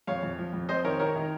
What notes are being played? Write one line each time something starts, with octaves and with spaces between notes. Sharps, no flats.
F2 C#5 F5
F2
F3
F2
C4 C5 D#5
D#3 A#4 C#5
D#3 A#4 C#5
D#3